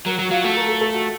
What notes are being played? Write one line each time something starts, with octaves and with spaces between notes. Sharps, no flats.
F#3 A#4
F#3 F#4
F#3 F4
A3 F#4
A#4
A4
A4
F#4